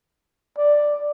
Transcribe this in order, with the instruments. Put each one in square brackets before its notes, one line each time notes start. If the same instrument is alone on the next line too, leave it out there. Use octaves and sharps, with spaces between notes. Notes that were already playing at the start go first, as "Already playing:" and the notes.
[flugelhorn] D5